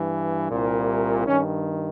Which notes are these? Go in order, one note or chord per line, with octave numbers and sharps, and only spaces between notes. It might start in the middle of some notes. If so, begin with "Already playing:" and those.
Already playing: G2 E3
C2 A#2
G2 D#3 C#4